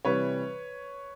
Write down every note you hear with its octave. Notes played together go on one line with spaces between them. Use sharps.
C3 E3 G3 B4 C#5